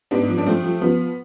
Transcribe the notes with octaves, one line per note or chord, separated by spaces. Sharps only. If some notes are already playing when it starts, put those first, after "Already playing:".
G#2 B3 D4
F3
D4
F3 A3 C4
F3
F3 B3